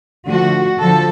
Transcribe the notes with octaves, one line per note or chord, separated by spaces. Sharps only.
D3 F3 A3 F#4
D3 F3 A4